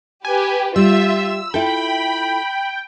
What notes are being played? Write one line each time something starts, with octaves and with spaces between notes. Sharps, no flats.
G4 B4 G#5
G3 F4 E5 E6
E4 F4 A4 G5 B5